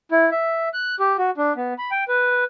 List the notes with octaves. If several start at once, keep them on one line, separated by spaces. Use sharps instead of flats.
E4
E5
F#6
G4
F#4
D4
B3
B5
G5
B4